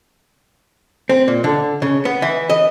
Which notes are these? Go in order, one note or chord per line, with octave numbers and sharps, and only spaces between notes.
C4
A#2
D3
C#3
B3
E3
D#5